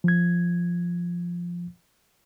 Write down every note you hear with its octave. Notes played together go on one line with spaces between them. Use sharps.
F3 G#6